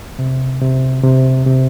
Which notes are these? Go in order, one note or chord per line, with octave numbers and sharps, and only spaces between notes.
C3
C3
C3
C3